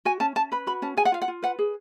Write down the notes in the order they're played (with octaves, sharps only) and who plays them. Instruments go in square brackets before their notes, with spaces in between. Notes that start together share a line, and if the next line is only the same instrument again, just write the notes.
[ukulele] F#4 G#5
C#4 A5
C#4 A5
B4 B5
F#4 B5
C#4 A5
G#4 G#5
F#5
F4 F5
F#5
F4
B4 F#5
G#4